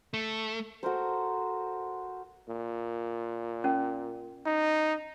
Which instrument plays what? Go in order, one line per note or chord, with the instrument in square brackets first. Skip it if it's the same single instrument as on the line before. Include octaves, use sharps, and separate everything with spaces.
[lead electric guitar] A3
[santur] F#4 A4 A#4 C5
[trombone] A#2
[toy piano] C#4
[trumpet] D#4